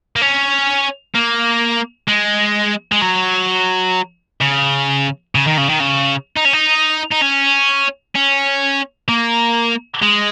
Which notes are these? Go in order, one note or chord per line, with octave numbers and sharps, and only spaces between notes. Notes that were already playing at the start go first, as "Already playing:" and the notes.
A#3
C#4
A#3
G#3
G#3
F#3
C#3
C#3
D#3
C#3
D#3
C#3
D#4
C#4
D#4
D#4
C#4
C#4
A#3
G#3